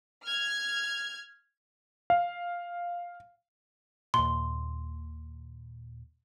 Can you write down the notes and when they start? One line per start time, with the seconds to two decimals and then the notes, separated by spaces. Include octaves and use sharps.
0.24 F6 G#6
2.10 F5
4.14 D#2 A#2 C6